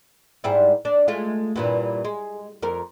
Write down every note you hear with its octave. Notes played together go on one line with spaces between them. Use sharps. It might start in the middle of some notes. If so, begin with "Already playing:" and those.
G#2 G3 E4
D4
G#3 A3 F4
G2 A#2 E3
G#3
F2 A#4